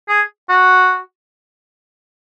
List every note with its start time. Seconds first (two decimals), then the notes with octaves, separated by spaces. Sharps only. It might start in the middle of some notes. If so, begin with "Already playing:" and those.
0.09 G#4
0.49 F#4